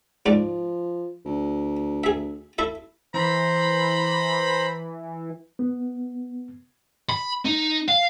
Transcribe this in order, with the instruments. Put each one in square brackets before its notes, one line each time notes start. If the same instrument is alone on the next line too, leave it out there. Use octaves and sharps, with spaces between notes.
[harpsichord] G#2 D4 D5 [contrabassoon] F3
[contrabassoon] D2
[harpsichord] G#4 E5
E4 A4 E5
[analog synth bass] E3 [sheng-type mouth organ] C5 A#5 [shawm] B5
[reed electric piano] B3
[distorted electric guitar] B5
D#4
F5